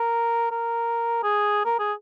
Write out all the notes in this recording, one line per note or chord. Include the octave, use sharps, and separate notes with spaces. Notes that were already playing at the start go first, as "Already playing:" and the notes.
Already playing: A#4
A#4
G#4
A#4
G#4